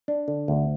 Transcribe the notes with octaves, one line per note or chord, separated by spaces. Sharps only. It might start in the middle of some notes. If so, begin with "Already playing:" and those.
D4
D3
D2